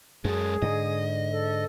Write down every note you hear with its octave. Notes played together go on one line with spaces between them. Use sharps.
F#2 G#3 G#4 A4
G#2 D3 D#5
A4